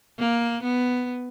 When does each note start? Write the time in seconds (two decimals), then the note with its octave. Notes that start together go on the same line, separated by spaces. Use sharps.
0.19 A#3
0.63 B3